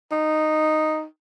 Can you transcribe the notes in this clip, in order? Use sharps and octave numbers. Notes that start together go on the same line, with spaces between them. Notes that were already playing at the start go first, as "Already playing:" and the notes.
D#4